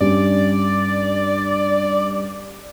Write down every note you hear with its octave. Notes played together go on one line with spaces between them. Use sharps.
G2 G3 C#4 D5